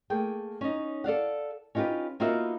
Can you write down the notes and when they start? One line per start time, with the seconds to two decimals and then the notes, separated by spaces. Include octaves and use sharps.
0.10 A3 A#3 G#4 G5
0.61 C#4 D#4
1.04 A4 D5 F5 F#5
1.75 C#4 D#4 F4 G4 B4
2.20 A#3 B3 D#4 F4 F#4 E5